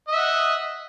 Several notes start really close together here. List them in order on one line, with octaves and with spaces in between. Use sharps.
D#5 E5 F#5